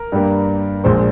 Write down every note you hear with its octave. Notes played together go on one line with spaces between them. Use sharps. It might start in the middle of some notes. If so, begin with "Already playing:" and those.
Already playing: A#4
G2 G3 A#3
A#1 A#2 G#3 C5